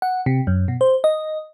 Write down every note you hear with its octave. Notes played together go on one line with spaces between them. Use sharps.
F#5
C3
F#2
B2
C5
D#5